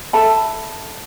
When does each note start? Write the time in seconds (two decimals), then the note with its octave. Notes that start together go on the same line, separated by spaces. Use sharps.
0.13 A4 E5 A5 B5